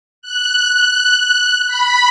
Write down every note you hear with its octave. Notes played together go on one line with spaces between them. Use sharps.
F#6
F#6
B5